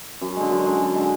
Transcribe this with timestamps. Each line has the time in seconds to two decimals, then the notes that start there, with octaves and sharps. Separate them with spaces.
0.21 F#2
0.37 D3 G#3
0.51 F#2
0.65 D3 G#3
0.81 F#2
0.95 D3 G#3